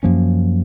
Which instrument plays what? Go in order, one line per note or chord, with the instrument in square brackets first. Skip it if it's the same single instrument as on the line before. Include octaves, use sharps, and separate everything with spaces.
[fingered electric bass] F#2 F3 A#3 C#4